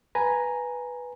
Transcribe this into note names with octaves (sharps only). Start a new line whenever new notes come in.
B4 G#5 A#5